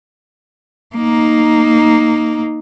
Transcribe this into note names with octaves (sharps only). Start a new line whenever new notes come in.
A#3 D#4